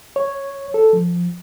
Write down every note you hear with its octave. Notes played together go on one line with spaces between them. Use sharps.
C#5
A4
F3